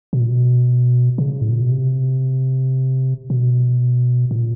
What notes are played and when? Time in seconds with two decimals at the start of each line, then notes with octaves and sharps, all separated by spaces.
0.13 B2
0.20 A#2
0.29 B2
1.18 C#3
1.42 A2
1.50 A#2
1.61 B2
1.71 C3
3.30 B2
4.31 A2
4.36 A#2